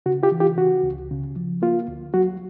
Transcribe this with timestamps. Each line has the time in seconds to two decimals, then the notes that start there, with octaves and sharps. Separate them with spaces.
0.06 C#3 F#4
0.23 F4 G4
0.32 E3
0.40 F4 G4
0.58 C#3 F#4
0.83 C#2
1.11 C#3
1.36 F3
1.62 A#3 F4
1.88 D2
2.14 F#3 F#4